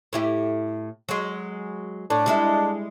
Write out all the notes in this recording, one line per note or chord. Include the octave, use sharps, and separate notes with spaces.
A2 E4 G4
F#3 G#3
A2 D4
G3 G#3 E4